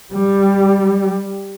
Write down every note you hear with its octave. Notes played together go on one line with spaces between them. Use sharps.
G3